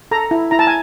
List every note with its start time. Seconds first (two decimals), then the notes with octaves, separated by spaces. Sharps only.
0.11 A4 A#5
0.31 E4
0.51 E4 A#5
0.59 A5
0.67 G#5